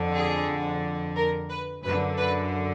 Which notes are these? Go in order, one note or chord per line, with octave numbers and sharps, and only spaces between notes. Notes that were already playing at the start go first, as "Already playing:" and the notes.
Already playing: F2 D3
G#4
A#4
B4
F#2 D3 B4
B4